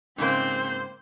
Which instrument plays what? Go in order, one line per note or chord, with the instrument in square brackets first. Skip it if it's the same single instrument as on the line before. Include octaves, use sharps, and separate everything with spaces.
[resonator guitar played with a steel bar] G#2 C#3 A#3 [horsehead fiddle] C4 C5